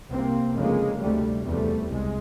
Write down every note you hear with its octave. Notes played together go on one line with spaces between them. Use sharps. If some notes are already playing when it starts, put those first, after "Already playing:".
C2 C3 A#3 C4
F1 F2 C#3 G#3 A#3
D2 C3 G3 A3
F1 E2 C3 G3 A3
C2 G#3